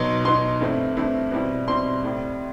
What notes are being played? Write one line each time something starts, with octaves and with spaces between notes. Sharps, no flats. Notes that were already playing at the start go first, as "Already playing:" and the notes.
Already playing: B2 F#3 B3 D#4 C6
B2 F#3 B3 D#4 C6
G2 E3 A3 C4 E4
G2 E3 A3 C4 E4
B2 G3 C4 E4
B2 G3 C4 E4 C6
A2 G3 C4